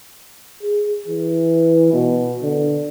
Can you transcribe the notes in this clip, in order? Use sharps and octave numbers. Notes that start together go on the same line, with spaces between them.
G#4
E3
B2
D3